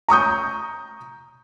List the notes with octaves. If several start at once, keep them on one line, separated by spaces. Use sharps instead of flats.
A#5 C#6 D#6 G6